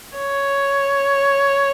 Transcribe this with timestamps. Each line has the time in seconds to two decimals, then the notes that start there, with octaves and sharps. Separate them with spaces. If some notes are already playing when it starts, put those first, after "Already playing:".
0.18 C#5